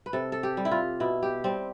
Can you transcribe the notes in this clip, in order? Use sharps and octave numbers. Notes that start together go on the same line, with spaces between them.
B4
C3 A4
A4
G4
G3
E4
F4
B2 E4
G4
G3 C4